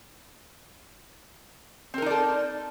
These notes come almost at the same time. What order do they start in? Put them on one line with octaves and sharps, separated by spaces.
C4 A#4 D#4 D5 A4